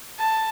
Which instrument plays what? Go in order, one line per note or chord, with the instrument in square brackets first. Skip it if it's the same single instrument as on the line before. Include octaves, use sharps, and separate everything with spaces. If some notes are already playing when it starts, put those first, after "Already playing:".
[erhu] A5